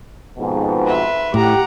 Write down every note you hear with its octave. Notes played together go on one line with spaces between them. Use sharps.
F2 G#2 B2
B4 E5 C6
A2 G4 F#5 A#5 D6